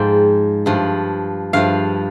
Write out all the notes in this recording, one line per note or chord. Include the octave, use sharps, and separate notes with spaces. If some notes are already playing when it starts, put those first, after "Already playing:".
Already playing: G#2 F3 G5
G2 F3
G2 F3 F5